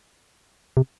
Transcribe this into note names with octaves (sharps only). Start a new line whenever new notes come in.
C3